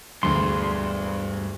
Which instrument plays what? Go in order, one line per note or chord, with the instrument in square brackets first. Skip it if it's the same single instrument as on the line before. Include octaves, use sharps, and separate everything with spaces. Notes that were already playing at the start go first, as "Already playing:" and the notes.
[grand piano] E1 D2 [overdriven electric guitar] G2 [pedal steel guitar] C6